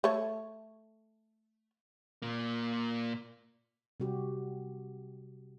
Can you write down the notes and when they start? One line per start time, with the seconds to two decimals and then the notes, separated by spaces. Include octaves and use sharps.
0.04 A3 A4 C#5
2.22 A#2 A#3
4.00 C3 G3 F#4 G4